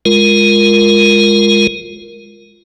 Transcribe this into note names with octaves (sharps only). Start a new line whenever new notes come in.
G#3 F4 A#4